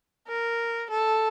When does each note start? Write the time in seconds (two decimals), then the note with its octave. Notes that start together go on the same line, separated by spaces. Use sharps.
0.28 A#4
0.91 A4